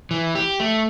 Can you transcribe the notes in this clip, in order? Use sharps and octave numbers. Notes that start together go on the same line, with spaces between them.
E3
G4
A3